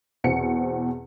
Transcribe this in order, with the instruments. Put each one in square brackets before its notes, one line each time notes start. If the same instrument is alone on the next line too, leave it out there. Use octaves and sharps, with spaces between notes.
[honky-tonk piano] E2 B2 C4 C#7